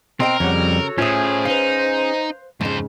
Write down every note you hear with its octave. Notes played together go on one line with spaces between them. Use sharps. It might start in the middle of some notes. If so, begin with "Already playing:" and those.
B2 C4 A#4 D#5 G5
F2 C#3 G3 C#5 F#5
F#4 A4 C#5
A2 C#4 F4 G#4 C5 E5
D#4 B4 F5
F2 G#2 C#3 C5